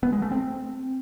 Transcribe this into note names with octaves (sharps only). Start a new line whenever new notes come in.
B3
G#3
A3
C4